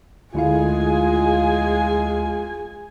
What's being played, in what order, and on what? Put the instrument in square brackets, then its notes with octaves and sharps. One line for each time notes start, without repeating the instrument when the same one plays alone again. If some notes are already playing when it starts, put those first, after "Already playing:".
[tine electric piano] D2 E4 F5 [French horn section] G#3 F4 [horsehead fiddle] G#4 G#5